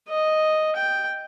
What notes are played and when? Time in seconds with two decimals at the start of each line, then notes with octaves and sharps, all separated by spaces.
0.09 D#5
0.76 G5